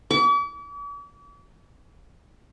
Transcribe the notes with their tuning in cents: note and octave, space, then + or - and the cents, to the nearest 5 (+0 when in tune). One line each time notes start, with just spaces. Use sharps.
D6 -45